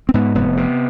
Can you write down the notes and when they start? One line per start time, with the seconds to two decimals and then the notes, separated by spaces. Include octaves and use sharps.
0.09 C4
0.14 G#2 B3
0.35 F1 B3
0.57 C3